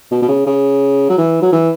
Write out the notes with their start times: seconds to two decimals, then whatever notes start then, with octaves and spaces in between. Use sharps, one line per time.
0.11 B2
0.22 B2
0.28 C#3
0.46 C#3
1.10 F#3
1.18 E3
1.42 F#3
1.52 E3